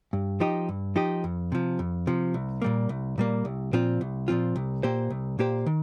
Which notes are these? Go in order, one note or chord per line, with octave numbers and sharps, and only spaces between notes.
G2
F3 D#4 G4 D#5
G2
F3 D#4 G4 D#5
F2
C3 F3
F2
C3 F3
C2
A#2 G3 A#3
C2
A#2 G3 A#3
C2
A#2 F3 C4 F4
C2
A#2 F3 C4 F4
C2
A#2 A#3 G4 C5
C2
A#2 A#3 G4 C5
D#3